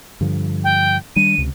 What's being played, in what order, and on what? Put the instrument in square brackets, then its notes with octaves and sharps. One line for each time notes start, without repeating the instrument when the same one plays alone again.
[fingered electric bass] G2 D3 F3
[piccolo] G5
[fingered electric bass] D#3 G3 D4 [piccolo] D#7
[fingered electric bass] C#2 C3